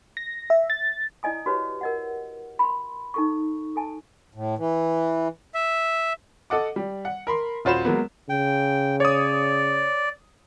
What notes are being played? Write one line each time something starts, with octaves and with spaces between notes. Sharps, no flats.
A#6
E5
A6
E4 D5 D#5 G#5 D#6
F#4 G4 B4 C#5
A#4 D#5 F#5
B5 C6
D#4 A4 C#6
A4 G#5 A5
A2
E3
E5
A4 D#5 F#5 D6
G3
F#5
A#4 B5 C6
D#1 F4 F#4 C5 B5 E7
F#3 G#3 A#3 B3
C#3 G5
C#5 D5 D#6